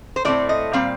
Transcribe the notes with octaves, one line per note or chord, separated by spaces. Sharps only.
C5
A2 A3 C4 D5
D#5
A#2 G3 C4 F5